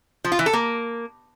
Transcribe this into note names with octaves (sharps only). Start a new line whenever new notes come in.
F3
F4
E3
A4
A#3